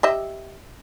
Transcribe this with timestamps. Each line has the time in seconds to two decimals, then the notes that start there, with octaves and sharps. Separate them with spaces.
0.03 G4 D#5 E5